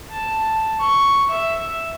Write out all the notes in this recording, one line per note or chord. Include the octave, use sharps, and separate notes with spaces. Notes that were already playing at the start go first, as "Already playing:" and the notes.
A5
C#6
E5